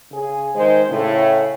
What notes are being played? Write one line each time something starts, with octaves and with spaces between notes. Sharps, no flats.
C#3 G#4
D#3 G#3 C5
A2 C#3